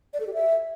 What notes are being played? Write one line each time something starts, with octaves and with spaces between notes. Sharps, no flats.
D5
A4
G4
E5